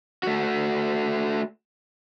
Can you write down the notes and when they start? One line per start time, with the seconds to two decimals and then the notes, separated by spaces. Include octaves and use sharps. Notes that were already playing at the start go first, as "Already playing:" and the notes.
0.23 A3 F#4